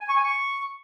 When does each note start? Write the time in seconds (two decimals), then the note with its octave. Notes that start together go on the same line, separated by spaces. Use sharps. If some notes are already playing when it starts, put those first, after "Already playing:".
0.01 G#5
0.08 C#6
0.16 G#5
0.24 C#6